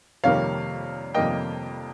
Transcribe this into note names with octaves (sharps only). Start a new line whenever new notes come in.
F2 C3 D#3 G3 A#3 C#5 F5
F2 C3 D#3 G3 A#3 D#5 G5